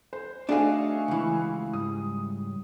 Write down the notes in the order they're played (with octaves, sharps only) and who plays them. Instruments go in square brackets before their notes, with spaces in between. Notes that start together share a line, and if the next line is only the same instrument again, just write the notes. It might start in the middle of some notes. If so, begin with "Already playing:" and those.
[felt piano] C5
[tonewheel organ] A3 E5 C#6 [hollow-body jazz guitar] D4 D#4 [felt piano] F#4 G#4 F5
[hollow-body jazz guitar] C#2 E3
[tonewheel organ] G#2 G3 [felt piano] D#6